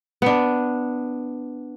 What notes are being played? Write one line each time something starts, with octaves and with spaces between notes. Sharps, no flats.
B3 D4